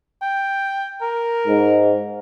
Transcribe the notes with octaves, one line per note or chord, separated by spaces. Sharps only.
G5
A#4
G#2